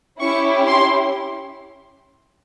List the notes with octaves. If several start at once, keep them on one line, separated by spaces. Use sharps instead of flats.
C#4 E4 G4 C#6
C6